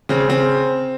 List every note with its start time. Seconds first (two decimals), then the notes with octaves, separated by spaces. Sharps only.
0.09 C#3 C4
0.29 C#3 C4